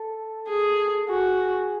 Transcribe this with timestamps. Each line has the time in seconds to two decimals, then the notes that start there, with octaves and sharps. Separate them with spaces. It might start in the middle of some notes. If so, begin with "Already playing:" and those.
Already playing: A4
0.48 G#4
1.09 F#4 G#4